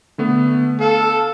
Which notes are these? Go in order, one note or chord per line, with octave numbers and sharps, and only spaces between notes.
D3 A3 B3
A4 F5